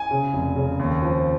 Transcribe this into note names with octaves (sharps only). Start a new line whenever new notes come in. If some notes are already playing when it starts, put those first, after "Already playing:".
Already playing: G#5
C#3
F1
C#3
D#2
F3